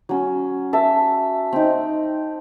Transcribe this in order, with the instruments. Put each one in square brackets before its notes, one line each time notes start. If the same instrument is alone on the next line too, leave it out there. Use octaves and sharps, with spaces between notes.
[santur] F#3 C#4
E5 A5
C4 D#4